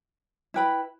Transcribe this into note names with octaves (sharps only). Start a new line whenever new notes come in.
E4 B4 G5 B5